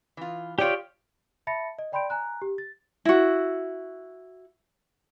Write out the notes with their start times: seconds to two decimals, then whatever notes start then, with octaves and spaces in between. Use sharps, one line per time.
0.17 E3 F4
0.59 F4 G4 C#5 D5 G5
1.47 E5 A5 B5 A6 A#6 C#7
1.79 D#5
1.92 D5 G5 B5 C6 G6 D7
2.10 G#5 A#5 F#6
2.42 G4
2.58 A6
3.05 E4 F#4